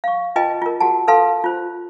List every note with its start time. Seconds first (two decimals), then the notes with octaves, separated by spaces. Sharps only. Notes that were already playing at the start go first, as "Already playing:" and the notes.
0.04 F5 C#6
0.36 F4 B4 D#5 G5 A5
0.62 F4 A#4
0.80 F#4 G#4 F#5 A5
1.08 A4 B4 F5 A5 C6
1.44 F4 C5